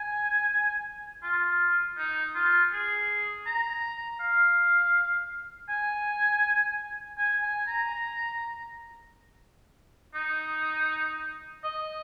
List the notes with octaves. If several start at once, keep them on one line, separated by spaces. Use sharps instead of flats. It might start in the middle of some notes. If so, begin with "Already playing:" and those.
Already playing: G#5
F4
D#4
F4
G#4
A#5
F5
G#5
G#5
G#5
A#5
D#4
D#5